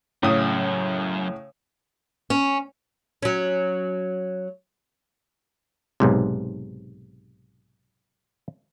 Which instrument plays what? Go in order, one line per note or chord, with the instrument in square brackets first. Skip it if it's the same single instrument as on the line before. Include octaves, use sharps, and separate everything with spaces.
[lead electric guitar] F#2 [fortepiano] A2 C#3 D#6
[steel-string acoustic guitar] C#4
[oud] F#3 C#4
[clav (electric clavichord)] B1 G#2 C3